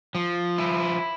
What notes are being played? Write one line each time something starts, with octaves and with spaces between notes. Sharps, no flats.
F3
E4